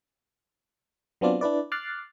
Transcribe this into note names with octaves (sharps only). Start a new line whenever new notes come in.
F#3 B3 C4 D4 F4 D5
D4 E4 B4 D5
D6 F6 F#6 A6 C7